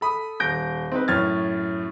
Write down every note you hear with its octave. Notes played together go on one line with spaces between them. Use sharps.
A4 B5 D#6
D#1 G6 A#6 D7
C4 D#4 B4
F#2 A2 F6 G#6 A6